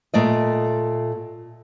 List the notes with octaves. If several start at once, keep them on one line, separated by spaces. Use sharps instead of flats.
A#2 A3 D5 D#5